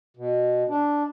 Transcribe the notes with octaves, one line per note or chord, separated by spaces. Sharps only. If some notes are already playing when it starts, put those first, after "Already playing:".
B2
D4